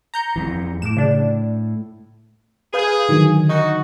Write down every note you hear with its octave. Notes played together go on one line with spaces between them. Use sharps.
A#5 G6 C#7
F2 E3
A2 D6 E7
C#3 D4
G#4 B4 F5 G6
D3 D#3 F#3
D#4 F#4